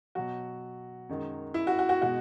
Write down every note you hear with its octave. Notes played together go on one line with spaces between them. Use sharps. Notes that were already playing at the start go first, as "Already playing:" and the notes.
B2 F#3 F#4
F#2 D#3 G#3
E4
F#4
F#4
F#4
B2 G#3 F#4